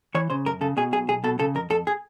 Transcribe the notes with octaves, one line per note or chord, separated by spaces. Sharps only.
E3 C#5
C#3 C5
F#2 A#4
C#3 A4
B2 G#4
B1 G#4
B1 G#4
B2 A4
C#3 A4
F2 A#4
F2 A4
G#4